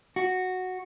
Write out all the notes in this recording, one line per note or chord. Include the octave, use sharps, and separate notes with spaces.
F#4